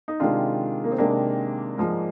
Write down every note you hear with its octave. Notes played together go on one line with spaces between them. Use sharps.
D#4
C3 D#3 G#3 D4 F4
A#3
C4
C3 D#3 G#3 A#3 D4
G#2 F3 G#3